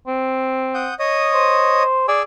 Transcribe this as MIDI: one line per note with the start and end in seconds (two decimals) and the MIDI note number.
0.07 0.89 60
0.74 0.94 78
0.74 0.94 87
0.74 0.94 91
0.99 1.83 73
0.99 1.83 75
0.99 1.83 87
1.34 2.04 72
2.08 2.23 68
2.08 2.22 74
2.08 2.23 80
2.08 2.23 88